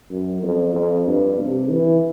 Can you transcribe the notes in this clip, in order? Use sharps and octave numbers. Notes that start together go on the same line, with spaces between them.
F#2
F2
F2
G2
C3
E3